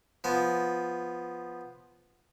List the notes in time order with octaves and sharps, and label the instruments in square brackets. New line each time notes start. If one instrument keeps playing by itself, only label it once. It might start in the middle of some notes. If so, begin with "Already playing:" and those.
[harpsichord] F3 B3